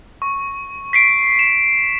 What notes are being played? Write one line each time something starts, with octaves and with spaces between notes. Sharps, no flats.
C#6
B6 C7 D7
E7